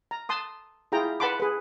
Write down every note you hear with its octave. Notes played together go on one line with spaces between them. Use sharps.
A#5
A5 C6 D#6
E4 F4 G#4 G5 A#5
B4 F#5 A5 B5 C6 D6
G#4 B4